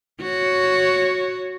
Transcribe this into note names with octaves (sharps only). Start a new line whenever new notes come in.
F#4 C#5